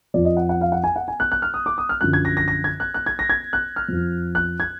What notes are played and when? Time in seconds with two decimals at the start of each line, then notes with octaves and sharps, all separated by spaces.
0.14 F2 F3 D5
0.25 D#5
0.37 F#5
0.49 F#5
0.61 F5
0.72 F#5
0.84 G#5
0.96 F#5
1.08 G#5
1.20 F#6
1.32 F#6
1.42 F6
1.54 D#6
1.66 D6
1.78 D#6
1.89 F6
2.01 F#2 D3 F3 F#6
2.13 G#6
2.25 A#6
2.37 A#6
2.48 A#6
2.64 G#6
2.80 F#6
2.94 F#6
3.06 G#6
3.19 A#6
3.30 G#6
3.53 F#6
3.76 F6
3.88 F2 F3
4.35 F#6
4.60 G#6